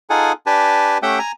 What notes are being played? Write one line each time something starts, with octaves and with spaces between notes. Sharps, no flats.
D#4 F4 G#4 A4 F#5 G#5
D4 G4 B4 G#5 A5
A3 C#4 G4 E5 F#5 G5
G#5 A#5